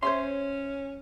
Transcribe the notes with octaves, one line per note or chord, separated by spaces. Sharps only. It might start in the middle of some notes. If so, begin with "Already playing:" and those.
C#4 C5 C#5 E5 C6